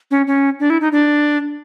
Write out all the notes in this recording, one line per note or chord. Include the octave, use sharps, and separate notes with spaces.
C#4
C#4
D4
E4
D#4
D4